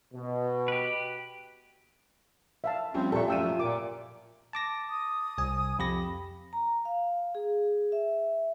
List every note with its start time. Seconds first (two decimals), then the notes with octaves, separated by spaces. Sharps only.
0.14 B2
0.68 G4 B4
2.64 E5 F5 A5
2.94 F3 G3 C4 C#4
3.12 A#2 G4 A4 E5 C#6
3.28 F#2 F3 A3 F5 G5 E6 D#7
3.46 F4
3.60 A#2 A#3 D6
4.53 A5 D6 A#6
4.89 D#6
5.38 C2 G#5
5.79 F2 G4 B5 A#6
6.53 A#5
6.85 F5
7.35 G#4
7.92 E5